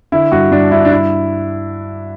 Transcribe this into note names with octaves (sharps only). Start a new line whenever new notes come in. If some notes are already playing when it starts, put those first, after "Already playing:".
D3 E4
G2 F#4
G2 D4
G2 E4
D4
E4